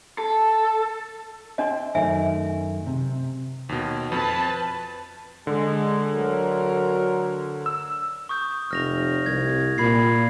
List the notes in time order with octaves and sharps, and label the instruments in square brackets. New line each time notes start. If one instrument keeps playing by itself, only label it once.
[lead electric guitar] A4
[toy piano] D4 D#5 [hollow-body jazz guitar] E5 G5 C6
[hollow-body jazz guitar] F#2 D#3 A3 [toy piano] E5 G#5
[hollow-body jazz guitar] C3
[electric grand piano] D#2 B2
[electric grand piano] F2 [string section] B4 A5
[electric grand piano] D3 [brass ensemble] G#3
[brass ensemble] D2 F#3 A#4
[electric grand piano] E6
[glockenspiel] C#6 D#6 G6
[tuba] F1 [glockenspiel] F6 A#6 F7
[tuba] C2 [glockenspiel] G#6
[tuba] A#2 [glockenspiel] B5 G#6 C7